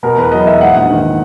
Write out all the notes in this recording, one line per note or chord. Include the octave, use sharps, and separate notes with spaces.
B2 A#4
E2 B4
F#3 D#5
E2 E5
G#2 F#5
A#1
D#3